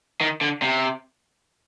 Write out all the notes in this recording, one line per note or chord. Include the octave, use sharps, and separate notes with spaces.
D#3
D3
C3